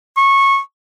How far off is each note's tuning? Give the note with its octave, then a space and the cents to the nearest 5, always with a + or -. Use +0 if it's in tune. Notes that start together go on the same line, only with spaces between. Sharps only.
C#6 -15